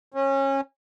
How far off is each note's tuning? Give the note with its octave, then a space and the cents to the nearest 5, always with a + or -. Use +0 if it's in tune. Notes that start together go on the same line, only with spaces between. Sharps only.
C#4 -25